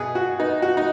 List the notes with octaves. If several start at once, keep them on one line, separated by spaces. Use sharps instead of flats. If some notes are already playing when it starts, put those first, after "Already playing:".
Already playing: B2 G#4 B4
F#4
B3 D#4
F#4
D#4